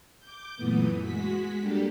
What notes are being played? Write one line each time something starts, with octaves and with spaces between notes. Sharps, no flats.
D6 G6
F#2 A#2 E3 A3 B3 D#6
G#3 F#4 B6
G3 A#3 D4 G4 A4